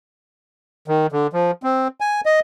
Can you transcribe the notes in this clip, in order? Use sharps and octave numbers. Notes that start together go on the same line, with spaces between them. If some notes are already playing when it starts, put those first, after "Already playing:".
D#3
D3
F3
C4
G#5
D#5